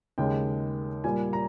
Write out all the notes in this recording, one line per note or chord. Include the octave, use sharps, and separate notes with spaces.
D#2 C#3 G#3 G5
A#2 G3 A#3 G#5
A#5